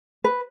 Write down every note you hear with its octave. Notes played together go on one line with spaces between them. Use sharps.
B4